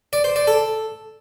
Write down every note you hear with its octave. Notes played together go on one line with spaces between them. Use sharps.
D5
C5
D5
A4